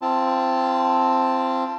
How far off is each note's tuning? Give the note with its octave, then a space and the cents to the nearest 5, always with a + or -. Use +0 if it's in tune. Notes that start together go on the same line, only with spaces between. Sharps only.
C4 +0 F4 -35 A5 +0